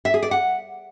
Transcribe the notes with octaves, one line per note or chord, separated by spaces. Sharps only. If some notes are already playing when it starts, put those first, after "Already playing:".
E5
G#4
D5
F#5